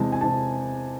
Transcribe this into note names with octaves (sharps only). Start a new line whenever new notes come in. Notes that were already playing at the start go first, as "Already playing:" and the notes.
Already playing: E2 C3 E3 G#3 A5
G#5
E2 C3 E3 G#3 A5